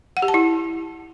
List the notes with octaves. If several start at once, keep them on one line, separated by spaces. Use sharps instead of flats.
F#5
G4
A5
E4